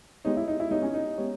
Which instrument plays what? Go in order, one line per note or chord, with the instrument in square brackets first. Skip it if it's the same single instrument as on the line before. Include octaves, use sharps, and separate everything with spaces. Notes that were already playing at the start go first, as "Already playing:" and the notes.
[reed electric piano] G#3 B3 G4 C#5 [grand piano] D#4
[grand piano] E4
D#4
E4
[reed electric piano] G#3 B3 G4 C#5 [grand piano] D#4
[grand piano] C#4
D#4
[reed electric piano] G#3 B3 G4 C#5